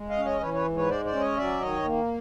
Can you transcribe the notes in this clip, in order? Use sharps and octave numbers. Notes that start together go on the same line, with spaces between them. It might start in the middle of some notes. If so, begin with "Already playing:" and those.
Already playing: G#3
D#5 F5
C#4
C#5 D#5
E3 B4 C#5
B4 C#5
G#2
B4 C#5
G#3 C5 D5
C5 D5
C#4
C#5 D#5
F#3 D5 E5
D#3 C#5 D#5
A#3